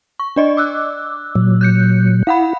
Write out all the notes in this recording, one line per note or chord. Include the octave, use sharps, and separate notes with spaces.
C#6
D4 D5 D#5
D6 E6 F#6
A#2 F#3
F#6 G6 C#7
E4 F5 F#5 B5